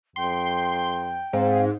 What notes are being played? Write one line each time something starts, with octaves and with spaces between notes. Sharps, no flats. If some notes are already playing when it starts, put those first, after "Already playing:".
F2 G5 C6
G#2 C4 F5